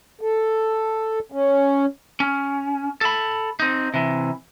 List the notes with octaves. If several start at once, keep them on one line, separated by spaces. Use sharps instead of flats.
A4
C#4
C#4
A4 B5
C4 D#4
C3 E3